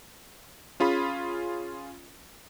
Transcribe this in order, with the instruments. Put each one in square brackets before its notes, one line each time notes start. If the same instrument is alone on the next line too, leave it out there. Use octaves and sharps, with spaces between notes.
[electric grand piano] C#4 F4 G#4 B5